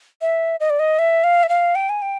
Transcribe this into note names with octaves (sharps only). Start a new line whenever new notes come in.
E5
D#5
D5
D#5
E5
F5
E5
F5
G5
G#5
G5